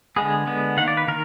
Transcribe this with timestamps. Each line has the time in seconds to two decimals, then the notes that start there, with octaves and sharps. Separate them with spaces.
0.16 D3 G#3 B3 G#4
0.47 D3 G#3 B3
0.77 D#3 A#3 F#5
0.88 D5
0.97 B4
1.08 D#3 A#4